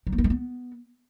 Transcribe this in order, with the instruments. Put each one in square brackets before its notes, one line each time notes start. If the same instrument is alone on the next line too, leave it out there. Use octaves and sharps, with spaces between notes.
[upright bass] F#3
A#3
B3
G#3
B3